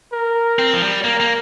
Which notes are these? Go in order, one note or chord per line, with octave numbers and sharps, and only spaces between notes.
A#4
C4
F3
G3
A#3 A#4
A#3